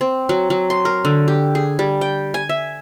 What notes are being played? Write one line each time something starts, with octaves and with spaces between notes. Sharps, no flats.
C4
F#3
F#3
C6
A#4
D3
G4
G#4
G3
G5
G#5
E5